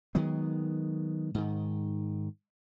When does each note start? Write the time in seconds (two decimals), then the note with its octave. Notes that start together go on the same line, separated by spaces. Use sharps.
0.15 D#3 F#3 G#3 B3
1.35 G#2 D#3